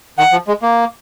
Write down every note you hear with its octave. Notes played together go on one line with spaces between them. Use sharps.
D#3 F#5
F3
G#3
A#3